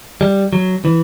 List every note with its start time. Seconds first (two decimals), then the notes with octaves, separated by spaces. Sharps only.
0.21 G3
0.53 F#3
0.85 E3